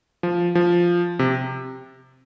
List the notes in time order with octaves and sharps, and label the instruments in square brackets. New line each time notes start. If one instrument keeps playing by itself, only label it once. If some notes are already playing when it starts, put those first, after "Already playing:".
[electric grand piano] F3
F3
C3